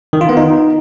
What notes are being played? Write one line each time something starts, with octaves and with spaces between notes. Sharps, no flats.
D#3
F4
B3
D#4